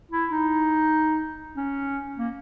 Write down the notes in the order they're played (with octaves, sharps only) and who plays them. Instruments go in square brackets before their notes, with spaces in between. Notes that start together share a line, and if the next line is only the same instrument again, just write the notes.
[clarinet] E4
D#4
C#4
A#3